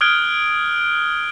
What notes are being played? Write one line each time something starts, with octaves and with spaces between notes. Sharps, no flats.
D#6 F6 F#6 G#6 D7 G7